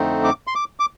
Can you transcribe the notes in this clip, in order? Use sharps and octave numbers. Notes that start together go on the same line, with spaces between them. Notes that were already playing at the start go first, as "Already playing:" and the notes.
Already playing: F2 D3 A3 C4 D#4
D6
C6
D6
D6